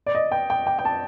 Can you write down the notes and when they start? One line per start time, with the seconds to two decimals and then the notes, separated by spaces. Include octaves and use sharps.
0.06 D5
0.15 D#5
0.32 G5
0.50 G5
0.67 G5
0.79 G5
0.85 A5